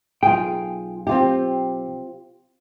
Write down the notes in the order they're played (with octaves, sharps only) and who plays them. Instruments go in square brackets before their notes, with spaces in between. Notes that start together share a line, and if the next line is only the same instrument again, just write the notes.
[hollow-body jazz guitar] B1 G5 [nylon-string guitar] F4 G#4
[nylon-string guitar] C4 F4 G4